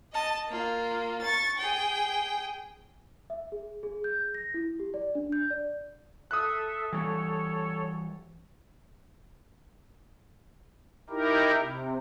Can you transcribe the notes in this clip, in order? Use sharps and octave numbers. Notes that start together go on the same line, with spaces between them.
D#5 A5
A#3 F4
C#6 A6
G#4 G5
E5
G#4
G#4
G6
A#6
E4
G4
D5
D4
G6
D5
A4 E5 D#6 F#6
E3 G3 A4 C#5
D#4 E4 G4 A#4
C3